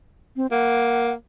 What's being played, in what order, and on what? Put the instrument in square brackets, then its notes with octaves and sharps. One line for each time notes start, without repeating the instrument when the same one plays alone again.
[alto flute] C4
[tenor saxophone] A#3 [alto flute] F#5